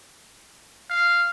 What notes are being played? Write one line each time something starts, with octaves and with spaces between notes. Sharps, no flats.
F5